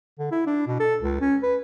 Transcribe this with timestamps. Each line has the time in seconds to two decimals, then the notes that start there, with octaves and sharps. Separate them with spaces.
0.19 D3
0.32 E4
0.47 D4
0.67 B2
0.80 A4
1.02 C#2
1.21 C#4
1.43 B4